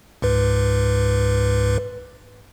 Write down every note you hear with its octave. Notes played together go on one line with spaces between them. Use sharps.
C#2 G#2 B4